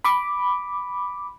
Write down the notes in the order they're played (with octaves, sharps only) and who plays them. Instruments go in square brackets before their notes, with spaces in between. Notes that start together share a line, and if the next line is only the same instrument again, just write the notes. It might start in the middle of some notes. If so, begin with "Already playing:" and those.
[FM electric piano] B5 D6